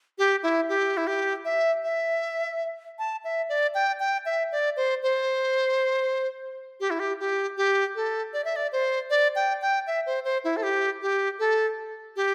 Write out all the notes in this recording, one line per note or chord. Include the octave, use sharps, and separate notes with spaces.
G4
E4
G4
E4
G4
E5
E5
A5
E5
D5
G5
G5
E5
D5
C5
C5
G4
E4
G4
G4
G4
A4
D5
E5
D5
C5
D5
G5
G5
E5
C5
C5
E4
A4
G4
G4
A4
G4